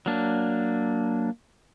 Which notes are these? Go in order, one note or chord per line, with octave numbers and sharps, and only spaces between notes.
F#3 A#3 D4